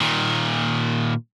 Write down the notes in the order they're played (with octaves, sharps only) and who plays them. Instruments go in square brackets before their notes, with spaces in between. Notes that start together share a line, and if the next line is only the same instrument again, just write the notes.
[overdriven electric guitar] A#2 D#3